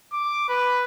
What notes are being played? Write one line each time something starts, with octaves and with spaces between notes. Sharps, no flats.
D6
B4